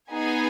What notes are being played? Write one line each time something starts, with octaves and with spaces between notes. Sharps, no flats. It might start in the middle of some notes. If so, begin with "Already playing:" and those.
B3 D#4 G#4 G#5